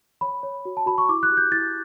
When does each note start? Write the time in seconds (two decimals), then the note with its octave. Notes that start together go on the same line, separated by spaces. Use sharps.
0.21 C#5 B5
0.43 C#5
0.65 F#4
0.77 A5
0.86 F#4 B5
0.98 C#6
1.09 E4 D6
1.23 F#6
1.30 G4
1.37 G6
1.52 E4 A6